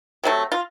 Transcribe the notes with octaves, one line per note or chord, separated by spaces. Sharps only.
C3 F#3 A3
F4